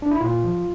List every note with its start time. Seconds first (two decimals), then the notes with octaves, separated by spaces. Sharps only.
0.02 D4
0.11 E4
0.21 A#2 F4
0.44 F3